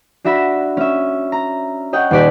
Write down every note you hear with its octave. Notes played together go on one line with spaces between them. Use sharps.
D4 F#4 E5 B5 A#6 E7
C#4 E5
A#5
C#5 D#5 F#5 G5
D#1 A#2 G4 D5 F#6 B6